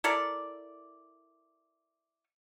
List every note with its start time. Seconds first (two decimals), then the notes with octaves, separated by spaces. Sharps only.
0.04 E4 A4 A#4 D5